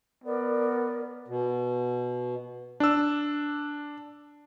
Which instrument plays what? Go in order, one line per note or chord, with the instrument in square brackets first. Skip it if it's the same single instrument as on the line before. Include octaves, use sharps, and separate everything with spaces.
[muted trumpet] B3 [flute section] A#4 C#5 D5
[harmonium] B2
[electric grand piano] D4 E6